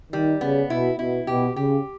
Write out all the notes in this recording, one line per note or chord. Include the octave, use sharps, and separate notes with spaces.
D#3 G3
C#3 B3
B2 E4
B2 E4
B2 G4
C#3 G4